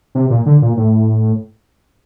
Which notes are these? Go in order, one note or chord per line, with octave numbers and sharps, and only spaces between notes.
C3
A#2
D3
A#2
A2